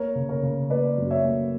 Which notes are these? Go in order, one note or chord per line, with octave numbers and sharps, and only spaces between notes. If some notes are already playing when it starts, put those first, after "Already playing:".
Already playing: A#3 A#4 C#5
C#3
A#4 C#5
C#3
A#3 B4 D5
F#2
C#5 E5
A#3